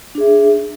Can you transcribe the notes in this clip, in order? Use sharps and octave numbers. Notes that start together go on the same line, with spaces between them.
D4 G#4 E5